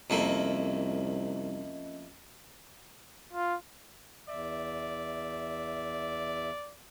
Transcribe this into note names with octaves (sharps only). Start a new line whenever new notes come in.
C2 F2 A3 A#3 C#4 D#5
F4
E2 D5 E5